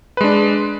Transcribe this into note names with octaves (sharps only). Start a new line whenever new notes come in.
G#3 D4 B4